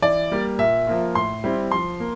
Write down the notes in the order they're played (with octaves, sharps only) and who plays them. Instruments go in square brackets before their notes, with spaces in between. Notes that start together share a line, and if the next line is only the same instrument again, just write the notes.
[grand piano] E3 D5
G3 A#3
A#2 E5
F3 A#3 F4
A2 C6
G3 C4 E4
F3 C6
A#3